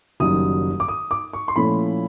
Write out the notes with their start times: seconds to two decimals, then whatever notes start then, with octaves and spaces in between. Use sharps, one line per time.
0.20 F#1 F#2 D#3 G3 D#6
0.80 D6
0.88 D#6
1.11 D6
1.33 C#6
1.48 C6
1.56 A#2 F3 A3 C#4 E4 B5